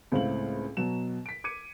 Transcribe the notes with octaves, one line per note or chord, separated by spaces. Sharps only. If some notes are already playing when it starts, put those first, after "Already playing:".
C#2 A2 C4 F5 F#7
B2 F#3 E7
B6 D7
D6 G#6 C#7 D#7